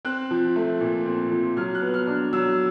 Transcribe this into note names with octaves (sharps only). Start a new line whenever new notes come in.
C4 F#6
F3
A3
A#2
C4
F3
F#3 F6
F#6
B3
F6
D4
F#3 E6